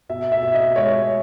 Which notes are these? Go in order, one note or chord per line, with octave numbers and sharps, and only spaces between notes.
B2 E5
E5
B2
D#5
G#3 C#5